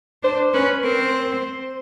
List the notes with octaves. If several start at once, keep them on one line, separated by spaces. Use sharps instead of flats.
D4 C5
C#4 B4
C4 A#4
C5